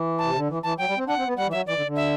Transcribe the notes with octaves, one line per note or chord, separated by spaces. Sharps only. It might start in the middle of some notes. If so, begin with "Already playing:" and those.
Already playing: E3
A5
C3
D3
E3
E3 A5
F#3 G5
G3
C4
D4 F#5
C4
B3
G3 F#5
E3
F#3 E5
E3 D5
D3
D3
E5